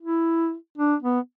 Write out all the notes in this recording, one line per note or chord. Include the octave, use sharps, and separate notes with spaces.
E4
D4
B3